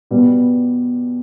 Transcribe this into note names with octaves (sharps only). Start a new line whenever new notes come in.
B2 G3 B3